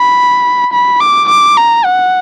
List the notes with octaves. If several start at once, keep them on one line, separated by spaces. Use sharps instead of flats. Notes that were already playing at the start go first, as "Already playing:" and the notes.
Already playing: B5
B5
D6
D6
A#5
F#5